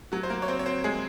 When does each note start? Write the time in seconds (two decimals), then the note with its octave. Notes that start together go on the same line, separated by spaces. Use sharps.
0.12 F#3 F#4
0.23 C5
0.30 A#3 A#4
0.42 C#5
0.48 C4 C5
0.59 C#5
0.66 C4 C5
0.84 G#3 G#4